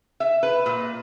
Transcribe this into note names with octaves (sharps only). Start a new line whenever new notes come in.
E5
B4
A#2